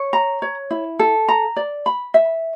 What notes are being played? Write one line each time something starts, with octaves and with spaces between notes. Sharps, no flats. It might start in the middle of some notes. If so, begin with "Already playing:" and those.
Already playing: C#5
A#5
C#5
E4
A4
A#5
D5
B5
E5